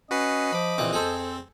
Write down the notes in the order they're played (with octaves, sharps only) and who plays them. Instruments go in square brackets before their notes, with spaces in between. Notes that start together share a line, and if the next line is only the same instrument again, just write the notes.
[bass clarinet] C#4 [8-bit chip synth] F#4 B4 C7 [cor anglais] D#5
[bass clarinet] F3 [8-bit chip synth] B5 D6
[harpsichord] A#1 E3 D6 [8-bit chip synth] C4
[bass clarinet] F2 [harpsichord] G#4 A4 C5